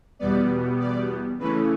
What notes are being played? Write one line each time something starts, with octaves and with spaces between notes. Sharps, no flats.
E2 B2 G3 B3 D5
D5
C#3 E3 A3 C#4 B4